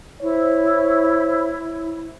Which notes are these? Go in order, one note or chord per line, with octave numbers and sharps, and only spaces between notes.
E4 C5 C#5